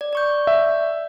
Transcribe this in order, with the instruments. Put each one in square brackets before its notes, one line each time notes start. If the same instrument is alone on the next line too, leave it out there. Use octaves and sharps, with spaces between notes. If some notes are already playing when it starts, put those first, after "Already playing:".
[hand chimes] D5
D5 C#6 G6
[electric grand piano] E5